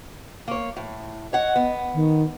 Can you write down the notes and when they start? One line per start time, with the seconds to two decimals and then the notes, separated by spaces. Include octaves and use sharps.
0.48 A#3 C#5
0.77 A2
1.33 C#5 D#5 F#5
1.56 B3
1.94 D#3